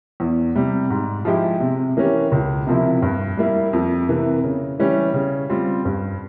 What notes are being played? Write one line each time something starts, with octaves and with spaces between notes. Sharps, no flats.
E2
C3 G3
G#2
F3 G#3 E4 G4
C3
E3 A#3 C#4 G4
C#2
C3 F3 A#3 E4
G2
G3 A#3 E4
F2
C3 E3 A#3
C#3
E3 G3 C#4
C#3
G3 C4 F4
G2